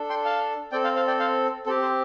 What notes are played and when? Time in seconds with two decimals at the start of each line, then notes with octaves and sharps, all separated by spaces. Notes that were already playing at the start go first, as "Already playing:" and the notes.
Already playing: D4 A4
0.10 G5 C6
0.25 F5 A5
0.72 C4 A4 D5 G5
0.84 C5 F5
0.96 C5 F5
1.07 D5 G5
1.19 C5 F5
1.66 C4 G4 A4
1.82 C5